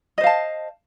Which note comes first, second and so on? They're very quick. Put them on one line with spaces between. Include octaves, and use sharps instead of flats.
D#5 C5 F5 A5